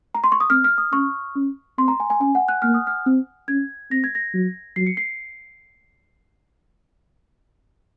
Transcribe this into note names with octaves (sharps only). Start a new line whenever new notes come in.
A#5
C6
C#6
D#6
C4 F6
F6
D#6
C#4 C#6
C#4
C4 C6
A#5
G#5
G#5
C#4 G#5
F#5
F#6
A#3 F6
D#6
F6
C4
C#4 G#6
C4 A#6
G#6
A#6
F#3
F#3 C7
C#7
C7